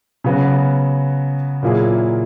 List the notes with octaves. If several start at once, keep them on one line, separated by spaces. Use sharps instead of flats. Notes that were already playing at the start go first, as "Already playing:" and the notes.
C#3 F#3 B3 F#4
A#2 F#3 A#3 E4 G#4